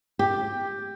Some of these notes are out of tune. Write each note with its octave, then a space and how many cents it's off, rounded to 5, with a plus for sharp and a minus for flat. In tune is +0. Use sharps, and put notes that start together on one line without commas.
G4 +5